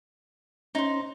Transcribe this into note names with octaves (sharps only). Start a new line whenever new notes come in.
C#4 D#4 C5